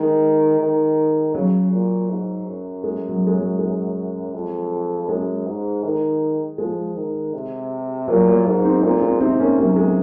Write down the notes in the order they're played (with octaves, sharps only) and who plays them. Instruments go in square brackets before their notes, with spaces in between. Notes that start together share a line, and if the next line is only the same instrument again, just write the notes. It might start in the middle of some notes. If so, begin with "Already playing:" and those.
Already playing: [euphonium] D#3 [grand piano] G#3
[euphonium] D#3
[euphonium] C#3 [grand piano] F#3
[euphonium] A#2
G#2
F#2
[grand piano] G#3
F#3
G#3
F#3
G#3
[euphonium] F2
[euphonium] F#2 [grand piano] G#3
[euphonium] G#2
D#3
[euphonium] F3 [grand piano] G#3
[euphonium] D#3
C3
[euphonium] A#2 [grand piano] F#3 A#3
[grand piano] F#3 A#3
[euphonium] G#2
[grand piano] C4 D#4
[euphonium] A#2 [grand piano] G#3 C4
[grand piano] G#3 C4
[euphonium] C3 [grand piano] C4 D#4
[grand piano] A#3 C#4
[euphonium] C3 [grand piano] F#3 A#3
[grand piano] G#3